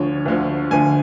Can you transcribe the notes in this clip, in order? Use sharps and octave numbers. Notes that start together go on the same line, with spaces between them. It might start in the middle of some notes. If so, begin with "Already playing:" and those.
Already playing: D2 D3 F3 C#5
D2 D3 F3
D2 D3 F3 G#5